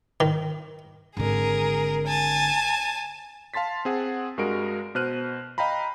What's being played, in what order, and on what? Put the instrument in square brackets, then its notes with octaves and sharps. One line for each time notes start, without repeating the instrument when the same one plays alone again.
[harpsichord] D#3
[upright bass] G#1 D3 [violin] G#4 A#4
[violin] G#5 A5
[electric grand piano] F5 A5 C6 A6 B6
C4 G#4 F#5
G2 G#3 F#4 A#4 D7
B2 C5 F6 F#6 D#7
D#5 F5 G5 A#5 B5